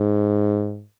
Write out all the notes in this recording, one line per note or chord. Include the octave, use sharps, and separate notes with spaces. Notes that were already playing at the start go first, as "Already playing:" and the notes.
Already playing: G#2